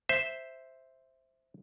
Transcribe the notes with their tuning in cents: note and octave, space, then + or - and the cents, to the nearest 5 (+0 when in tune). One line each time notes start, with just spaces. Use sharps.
C5 +0 E5 +0